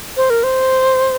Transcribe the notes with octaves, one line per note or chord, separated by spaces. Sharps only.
C5
A#4
C5